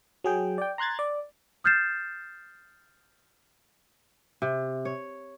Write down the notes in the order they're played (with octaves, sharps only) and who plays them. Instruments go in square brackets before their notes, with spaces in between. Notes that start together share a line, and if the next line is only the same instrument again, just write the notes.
[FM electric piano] F#3 G#4 G5
D5 G5
A#5 C6 F#6 G#6 A6
D5
[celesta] D#6 F6 G6 A6 C7 E7
[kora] C3
C#5